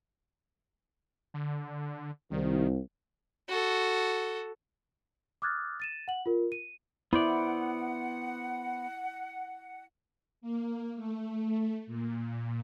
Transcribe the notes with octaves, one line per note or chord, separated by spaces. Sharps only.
D3
C2 D#3
F#4 A4
D6 D#6 F6 F#6 G#6 A6
A6 D#7 E7
F#5 F#7
F4 A#4
D#7
B3 E4 C5 D5 F#5
A#3
A3
A#2